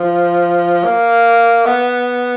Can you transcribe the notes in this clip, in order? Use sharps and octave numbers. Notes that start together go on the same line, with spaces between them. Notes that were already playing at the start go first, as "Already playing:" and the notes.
Already playing: F3
A#3
B3